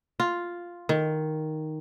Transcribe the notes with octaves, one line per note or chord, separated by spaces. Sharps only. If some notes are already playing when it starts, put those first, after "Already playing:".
F4
D#3